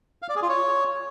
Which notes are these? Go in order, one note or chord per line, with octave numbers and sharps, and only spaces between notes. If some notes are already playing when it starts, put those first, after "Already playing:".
F5
D5
G#4
F4
C#5